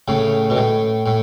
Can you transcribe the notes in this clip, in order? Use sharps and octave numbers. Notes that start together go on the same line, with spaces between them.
A2 C#3
B2
A2
A2